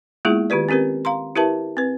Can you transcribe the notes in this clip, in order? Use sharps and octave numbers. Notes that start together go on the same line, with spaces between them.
G#3 A#3 B3 E4 F4 G#4
D#3 F4 G4 B4 D5
C4 C#4 G4 A#4 B4
F5 A#5 C6
E4 G4 A#4 B4 E5 A5
C4 B4